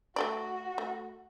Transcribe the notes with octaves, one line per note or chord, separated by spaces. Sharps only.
A3 F#4 A4 D5
A3